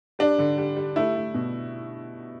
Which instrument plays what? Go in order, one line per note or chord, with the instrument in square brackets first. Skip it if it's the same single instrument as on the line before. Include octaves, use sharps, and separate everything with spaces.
[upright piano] G3 D4
D3
G3
G3
A3 E4
A3
B2